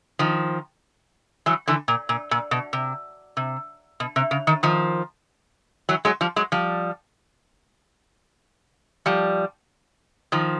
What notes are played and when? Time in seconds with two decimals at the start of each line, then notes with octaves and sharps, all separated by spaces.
0.19 D#3 F3
1.46 E3 F#3
1.68 D3 E3
1.88 A#2
2.09 A#2
2.31 A#2
2.51 B2
2.73 C3
3.37 C3
4.00 B2
4.16 C3
4.31 C#3
4.47 D#3
4.63 D#3 F3
5.89 E3 F#3
6.05 F#3 G#3
6.21 F3 G3
6.36 F#3 G#3
6.52 F3 G3
9.06 F3 G3
10.32 D#3 F3